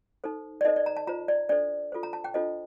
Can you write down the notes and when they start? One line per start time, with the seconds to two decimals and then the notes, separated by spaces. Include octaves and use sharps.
0.24 D#4 A4 C5
0.61 D5
0.65 D#4 A4 C5 D#5
0.76 D5
0.86 A#5
0.97 A5
1.07 F4 C5 A#5
1.28 D5
1.49 D4 A4 C5 D5
1.92 F4 A4 C5
2.03 A#5
2.13 A5
2.24 G5
2.34 D4 F4 A4 C5 D#5